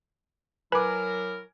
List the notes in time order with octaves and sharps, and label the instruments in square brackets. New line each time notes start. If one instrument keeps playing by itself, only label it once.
[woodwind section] F#3 E4 A#4 [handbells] B4 B5 [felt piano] G#5 D6